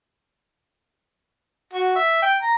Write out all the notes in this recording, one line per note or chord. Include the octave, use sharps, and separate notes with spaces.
F#4
E5
G5
A#5